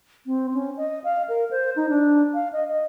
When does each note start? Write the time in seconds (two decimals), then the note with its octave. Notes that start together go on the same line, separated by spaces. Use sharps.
0.26 C4
0.54 C#4
0.77 D#5
1.04 F5
1.29 A#4
1.51 C5
1.76 D#4
1.89 D4
2.34 F5
2.53 D#5
2.69 D#5